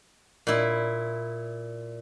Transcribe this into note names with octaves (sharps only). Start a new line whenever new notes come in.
A#2 E4